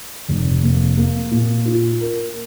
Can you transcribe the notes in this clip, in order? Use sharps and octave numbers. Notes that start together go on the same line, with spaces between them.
F1
A#3
A#3
A#2
F4
A#4